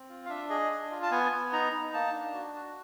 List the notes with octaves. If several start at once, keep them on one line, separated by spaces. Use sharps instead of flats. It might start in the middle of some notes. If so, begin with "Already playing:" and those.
Already playing: C4
F4
F5
D4 E5
G#4 D#5
D4
F4
A5
B3 G#5
B3
D#4 A#5
D#4
A#3 A5
D4
F#4
F#4